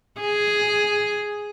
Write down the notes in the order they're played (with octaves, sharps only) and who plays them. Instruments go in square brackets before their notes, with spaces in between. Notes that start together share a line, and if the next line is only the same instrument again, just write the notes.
[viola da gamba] G#4